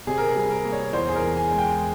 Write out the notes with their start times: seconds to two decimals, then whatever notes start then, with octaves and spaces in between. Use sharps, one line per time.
0.07 C3 G#4
0.18 A#4
0.29 G#4
0.36 G3
0.51 A#4
0.65 A#3
0.72 C#5
0.93 E2 C5
1.08 G#4
1.15 A#4
1.22 E3
1.37 G#5
1.51 G#3
1.58 G5